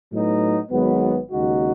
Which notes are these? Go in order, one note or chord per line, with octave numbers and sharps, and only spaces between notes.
A2 F#3 B3 D#4
G#1 G#2 F#3 B3
D#2 C#3 G#3 D#4 F#4